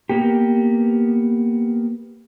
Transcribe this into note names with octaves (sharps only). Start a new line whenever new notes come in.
A#3 B3 G4